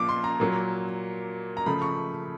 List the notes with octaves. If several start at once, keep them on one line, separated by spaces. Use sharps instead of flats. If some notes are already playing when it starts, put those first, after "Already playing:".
Already playing: A#2 F3 A#3 D6
C6
A#5
A#2 F#3 A#3
A#5
C#3 F3 A3 B5
C#6